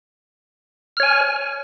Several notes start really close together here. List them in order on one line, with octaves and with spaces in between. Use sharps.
F6 C#5 G#5